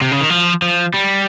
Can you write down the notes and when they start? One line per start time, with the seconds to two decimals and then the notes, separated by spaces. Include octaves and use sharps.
0.02 C3
0.11 C#3
0.21 D#3
0.30 F3
0.62 F3
0.94 G3